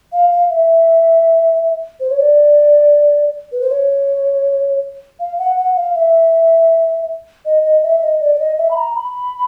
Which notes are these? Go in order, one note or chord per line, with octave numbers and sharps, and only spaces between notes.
F5
F5
E5
C5
C#5
D5
B4
C5
C#5
F5
F#5
F#5
F5
E5
D#5
D#5
E5
D#5
D5
D5
D#5
E5
B5
A#5
B5